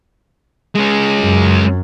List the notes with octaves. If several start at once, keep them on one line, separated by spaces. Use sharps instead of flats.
G#3 C#4
F#2